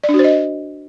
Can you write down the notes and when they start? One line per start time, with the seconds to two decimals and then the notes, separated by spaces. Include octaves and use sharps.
0.04 D5
0.09 D4
0.14 F#4
0.19 C5
0.24 D#5